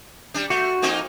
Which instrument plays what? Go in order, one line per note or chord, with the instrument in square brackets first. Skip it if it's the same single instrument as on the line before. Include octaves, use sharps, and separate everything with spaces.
[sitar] G3 D4
[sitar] A3 [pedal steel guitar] F#4
[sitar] F2 A#3 D#4